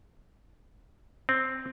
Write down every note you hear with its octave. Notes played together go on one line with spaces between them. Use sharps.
C4